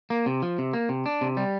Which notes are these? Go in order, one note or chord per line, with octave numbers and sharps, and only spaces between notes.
A#3
C3
F3
C3
A#3
C3
D4
C3
G3